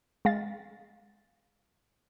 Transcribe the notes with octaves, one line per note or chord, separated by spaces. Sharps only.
G#3 F5 A6